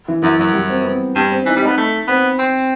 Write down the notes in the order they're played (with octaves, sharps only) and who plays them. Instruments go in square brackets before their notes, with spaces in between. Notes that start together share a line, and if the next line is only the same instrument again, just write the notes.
[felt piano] E3
[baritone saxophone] F#2 [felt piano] E3
[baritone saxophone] F#2 [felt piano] F#3
[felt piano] G3
C4
B3
[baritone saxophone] G2 [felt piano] B3
[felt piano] C4
[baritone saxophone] E3 [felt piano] D#4
[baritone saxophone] G3
[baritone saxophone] B3 [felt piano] D#4
[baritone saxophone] A3
[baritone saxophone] B3 [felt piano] C4
[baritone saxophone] C4